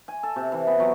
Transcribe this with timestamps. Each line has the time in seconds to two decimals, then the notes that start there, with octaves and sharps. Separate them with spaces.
0.08 G#5
0.23 A4
0.36 C3
0.52 E3
0.67 B3
0.80 F#3